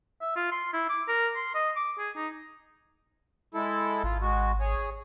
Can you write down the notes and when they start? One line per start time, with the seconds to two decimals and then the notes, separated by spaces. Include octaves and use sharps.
0.21 E5
0.36 F4
0.52 C6
0.73 E4
0.89 D6
1.08 A#4
1.36 C6
1.55 D#5
1.76 D6
1.99 G#4
2.16 D#4
3.54 G#3 E4 A4
4.03 G#1 F4
4.21 G#3 F#4
4.60 G#4 C#5